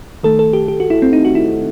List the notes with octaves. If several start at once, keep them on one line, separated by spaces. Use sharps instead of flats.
D#3 A3 A4
A4
G4
G4
F#4
E4
C4
D#4
F#4
E4